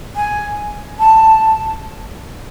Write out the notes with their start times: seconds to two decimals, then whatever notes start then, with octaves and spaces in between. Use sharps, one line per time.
0.16 G#5
0.99 A5